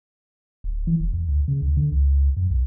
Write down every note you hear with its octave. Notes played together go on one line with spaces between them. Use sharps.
D1
E3
E1
E2
D2
C#3
D2
D3
C#2
F#2
B1